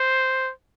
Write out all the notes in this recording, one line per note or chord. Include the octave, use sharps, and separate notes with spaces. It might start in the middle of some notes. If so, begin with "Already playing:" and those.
Already playing: C5